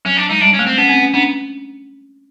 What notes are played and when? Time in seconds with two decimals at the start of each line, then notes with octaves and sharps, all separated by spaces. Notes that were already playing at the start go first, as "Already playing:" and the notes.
0.05 F#3 C#4
0.17 D4
0.29 G#3 D#4
0.41 G3 D4
0.54 C#4
0.59 A3
0.66 C4
0.78 B3 C#4
0.89 C4
0.99 C#4
1.14 B3 D4